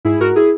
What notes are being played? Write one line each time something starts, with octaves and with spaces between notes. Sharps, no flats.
G#2 E4 G#4
G#2 F#4 A#4
E4 G#4